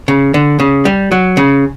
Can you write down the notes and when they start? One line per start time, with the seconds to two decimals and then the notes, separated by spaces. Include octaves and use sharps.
0.08 C#3
0.34 D3
0.60 C#3
0.85 G3
1.12 F#3
1.37 C#3